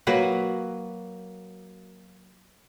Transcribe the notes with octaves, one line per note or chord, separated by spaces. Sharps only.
F#3 A#3 F#4 B4